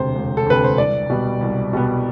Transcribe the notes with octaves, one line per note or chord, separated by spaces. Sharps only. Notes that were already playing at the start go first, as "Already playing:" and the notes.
Already playing: E1 D2 C3 C5
E1
A4
D2 C3 B4
C5
C2 D5
B2 G3 B3
C2
B2 G3 B3